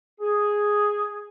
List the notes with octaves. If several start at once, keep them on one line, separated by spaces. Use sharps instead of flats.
G#4